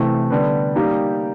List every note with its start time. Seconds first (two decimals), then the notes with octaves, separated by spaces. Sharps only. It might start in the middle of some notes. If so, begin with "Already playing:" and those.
Already playing: C3 E3 A3
0.30 D3 G3 B3
0.76 G3 A#3 D#4 G4